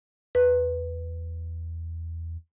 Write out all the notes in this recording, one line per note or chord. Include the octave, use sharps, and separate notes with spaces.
E2 B4